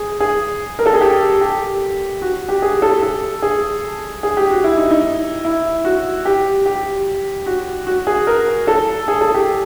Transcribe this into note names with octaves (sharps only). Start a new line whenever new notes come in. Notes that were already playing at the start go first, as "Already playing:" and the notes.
Already playing: G#4
G#4
A#4
A4
G#4
G4
G4
F#4
G4
G#4
A4
A4
G#4
G#4
G4
F#4
E4
D#4
D#4
E4
F#4
G4
G4
F#4
F#4
G#4
A#4
A4
G#4
A4
G4